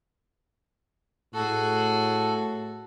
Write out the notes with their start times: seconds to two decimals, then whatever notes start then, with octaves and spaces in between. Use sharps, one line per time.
1.34 A2 F#4 G#4 A4